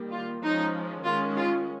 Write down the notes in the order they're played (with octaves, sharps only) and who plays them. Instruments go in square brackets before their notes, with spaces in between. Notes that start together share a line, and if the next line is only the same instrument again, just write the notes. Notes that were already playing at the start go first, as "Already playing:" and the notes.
Already playing: [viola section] D#3 G3 A#3
F4
F3 G#3 C#4 D#4
D#3 G#3 C#4 F4
F4